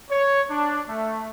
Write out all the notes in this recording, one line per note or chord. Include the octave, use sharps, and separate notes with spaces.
C#5
D4
A3